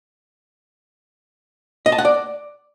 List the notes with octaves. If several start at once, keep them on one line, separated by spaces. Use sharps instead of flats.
D#5
A5
F#5
D5